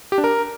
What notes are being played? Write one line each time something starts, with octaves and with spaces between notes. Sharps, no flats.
G4
D4
A#4